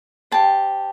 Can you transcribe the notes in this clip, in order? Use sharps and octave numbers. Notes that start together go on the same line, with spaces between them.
G4 C5 A5